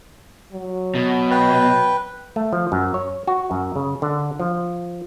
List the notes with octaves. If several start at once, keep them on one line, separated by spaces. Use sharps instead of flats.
F#3
B2
B4 G5
A3
F3
F#2
C#5
F#4
F#2
C#3
D3
F3